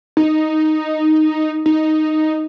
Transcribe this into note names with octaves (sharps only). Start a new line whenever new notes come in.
D#4
D#4